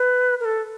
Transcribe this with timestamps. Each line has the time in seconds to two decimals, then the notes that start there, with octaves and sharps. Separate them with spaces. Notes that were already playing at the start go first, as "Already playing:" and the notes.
Already playing: B4
0.40 A#4
0.45 A4